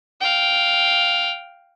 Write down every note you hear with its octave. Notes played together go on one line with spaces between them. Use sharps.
F5 G5